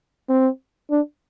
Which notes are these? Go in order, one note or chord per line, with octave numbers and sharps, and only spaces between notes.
C4
D4